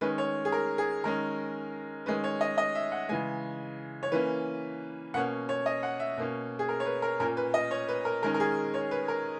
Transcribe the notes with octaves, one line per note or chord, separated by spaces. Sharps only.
D#3 G#3 C#4 B4
C#5
G#4
A#4
G#4
D#3 G#3 C#4 A#4
D#3 G#3 C#4 B4
C#5
D#5
D#5
E5
F#5
C#3 E3 G#3 G#5
C#5
E3 A#3 C#4 B4
B2 A#3 C#4 F#5
C#5
D#5
F#5
E5
B2 A#3 C#4
G#4
A#4
C#5
B4
A#4
A#2 A#3 C#4 A#4
B4
D#5
C#5
B4
A#4
D#3 G#3 C#4 A#4
A#4
G#4
C#5
B4
A#4